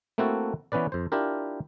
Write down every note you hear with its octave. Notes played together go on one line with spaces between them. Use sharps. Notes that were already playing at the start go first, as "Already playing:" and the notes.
A3 A#3 C4 E4 F#4 A4
E3 B3 C#4 B4 D5
F2 C5
D4 E4 F4 G4 A#4